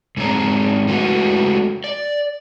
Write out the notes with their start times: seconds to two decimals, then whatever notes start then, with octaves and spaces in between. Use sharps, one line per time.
0.17 G#2 G#3 C4 C#5 A#5
0.88 G#3 A3 F#4 B4 C#5 F#5
1.84 D5